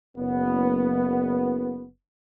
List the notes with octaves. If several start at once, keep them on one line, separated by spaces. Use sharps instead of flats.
F#1 B3